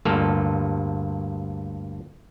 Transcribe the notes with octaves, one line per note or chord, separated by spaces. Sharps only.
D2 G2 A#3 F4 A4